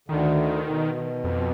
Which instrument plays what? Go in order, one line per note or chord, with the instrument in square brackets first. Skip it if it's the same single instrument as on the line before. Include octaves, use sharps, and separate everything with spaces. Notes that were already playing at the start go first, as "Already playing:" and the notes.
[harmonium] D2 D3 [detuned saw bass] D#3
[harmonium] B2
[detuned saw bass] F2